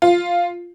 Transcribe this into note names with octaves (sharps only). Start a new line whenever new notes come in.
F4